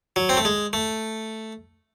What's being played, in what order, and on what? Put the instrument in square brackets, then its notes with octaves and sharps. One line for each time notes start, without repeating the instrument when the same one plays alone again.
[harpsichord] F#3
C4
A3
G#3
A3